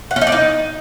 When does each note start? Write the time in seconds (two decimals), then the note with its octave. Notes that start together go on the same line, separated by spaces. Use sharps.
0.11 F#5
0.16 C#4
0.21 D#4
0.27 D5
0.32 D#4